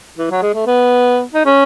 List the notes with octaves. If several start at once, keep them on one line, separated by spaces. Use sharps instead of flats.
E3
F#3
G#3
A3
B3
D#4
C#4